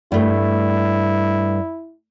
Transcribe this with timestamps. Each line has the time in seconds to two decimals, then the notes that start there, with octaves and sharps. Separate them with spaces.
0.12 G2 A3 E4